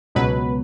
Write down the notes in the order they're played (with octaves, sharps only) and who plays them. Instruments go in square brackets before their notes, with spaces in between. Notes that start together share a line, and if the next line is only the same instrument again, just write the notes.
[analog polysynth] C#2 B2 F#3 B4